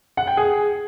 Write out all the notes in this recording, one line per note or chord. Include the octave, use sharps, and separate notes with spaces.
F#5
G5
G#4